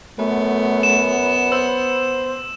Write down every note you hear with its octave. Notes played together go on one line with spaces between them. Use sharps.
F#2 A3 B3
E7
C5 E6